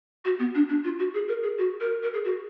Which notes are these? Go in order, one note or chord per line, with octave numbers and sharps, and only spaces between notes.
F#4
B3
D4
D4
F4
F#4
G#4
A#4
G#4
F#4
A#4
A#4
G#4
F#4